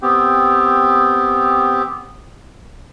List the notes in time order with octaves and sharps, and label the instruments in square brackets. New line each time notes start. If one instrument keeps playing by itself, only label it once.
[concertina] B3 C4 G4